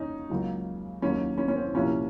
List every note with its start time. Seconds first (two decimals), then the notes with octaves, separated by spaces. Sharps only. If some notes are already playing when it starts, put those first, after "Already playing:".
Already playing: D#2 C#3 C#4 D#4
0.30 C#2 C#3 F#3 A#3
1.02 D#2 D#3 F#3 A#3 C#4
1.38 C#4
1.48 C#4
1.56 C4
1.74 C2 A#2 F3 A#3 C#4